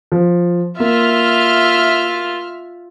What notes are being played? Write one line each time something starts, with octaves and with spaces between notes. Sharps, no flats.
F3
A#3 F4 E5 F6